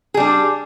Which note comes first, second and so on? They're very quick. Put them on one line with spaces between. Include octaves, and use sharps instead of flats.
G#4 G3 D4